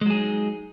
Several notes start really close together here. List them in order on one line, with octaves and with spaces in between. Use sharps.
G#3 F#3 G#4 D#4